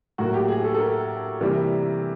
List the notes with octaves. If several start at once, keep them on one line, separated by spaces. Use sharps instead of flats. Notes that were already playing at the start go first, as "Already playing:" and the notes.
A2 F#3 A#3 F#4
G4
G#4
A4
A4
A#4
C3 E3 G3 A#3